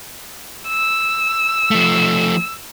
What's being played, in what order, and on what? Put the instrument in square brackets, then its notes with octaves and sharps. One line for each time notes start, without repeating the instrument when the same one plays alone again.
[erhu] E6
[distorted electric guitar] F3 A3